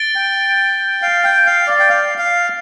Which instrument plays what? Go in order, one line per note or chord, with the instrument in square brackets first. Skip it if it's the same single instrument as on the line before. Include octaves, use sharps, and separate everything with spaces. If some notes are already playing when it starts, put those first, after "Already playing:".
Already playing: [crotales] A6 D7 G7
[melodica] G5
F5
G5
F5
D5
G5
F5
F5